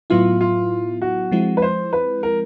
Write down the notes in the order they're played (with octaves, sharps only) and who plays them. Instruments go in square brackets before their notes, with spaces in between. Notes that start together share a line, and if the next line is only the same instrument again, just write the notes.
[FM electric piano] A2 F#3 B3 E4 [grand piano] F4
[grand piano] F4
F#4
[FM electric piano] F3 G#3 C4 E4
[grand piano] B4
C5
B4
A#4